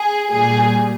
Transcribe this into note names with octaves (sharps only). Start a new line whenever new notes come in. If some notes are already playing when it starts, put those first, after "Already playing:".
Already playing: G#4
A#2 G3 G#4